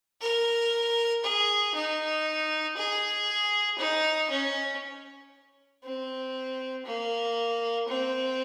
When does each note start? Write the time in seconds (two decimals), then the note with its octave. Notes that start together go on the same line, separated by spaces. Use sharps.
0.22 A#4
1.24 G#4
1.75 D#4
2.77 G#4
3.79 D#4
4.30 C#4
5.84 C4
6.86 A#3
7.88 C4